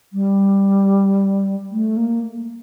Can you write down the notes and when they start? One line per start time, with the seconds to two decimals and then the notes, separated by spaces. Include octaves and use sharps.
0.13 G3
1.71 A3
1.97 A#3